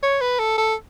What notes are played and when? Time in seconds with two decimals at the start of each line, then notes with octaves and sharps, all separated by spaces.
0.02 C#5
0.21 B4
0.39 A4
0.58 A4